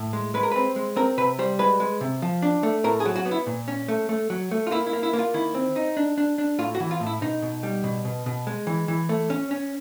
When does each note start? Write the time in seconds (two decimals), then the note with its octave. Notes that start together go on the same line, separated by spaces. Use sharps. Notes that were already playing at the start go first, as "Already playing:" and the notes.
Already playing: A2
0.13 G#3
0.34 G#3 B4
0.43 A#4
0.52 C4 B4
0.76 G#3
0.96 C4 A#4
1.18 C3 B4
1.39 G3 C5
1.59 G#3 B4
1.80 G#3
2.01 C3
2.22 F3
2.42 D4
2.63 A3
2.84 A2 A#4
3.00 G#4
3.05 F#3
3.16 F#4
3.26 B3
3.31 E4
3.47 A#2
3.68 C#4
3.88 A3
4.09 A3
4.30 F#3
4.51 A3
4.67 F4
4.71 A#3 E4
4.87 E4
4.93 A#3
5.03 E4
5.13 A#3 E4
5.19 F4
5.34 D#3 E4
5.55 C4
5.76 D#4
5.97 D4
6.18 D4
6.38 D4
6.59 A2 F4
6.75 F#4
6.80 E3
6.91 F4
7.00 A2
7.06 E4
7.21 B2 D#4
7.42 B2
7.63 G3
7.84 B2
8.05 B2
8.26 B2
8.47 G#3
8.67 E3
8.88 E3
9.09 A3
9.30 C#4
9.51 C#4